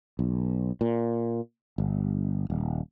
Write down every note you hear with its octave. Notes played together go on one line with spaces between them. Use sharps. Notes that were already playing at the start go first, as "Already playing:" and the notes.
B1
A#2
G1
D#1